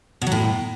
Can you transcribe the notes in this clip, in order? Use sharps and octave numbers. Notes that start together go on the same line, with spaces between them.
B2
F#3
A2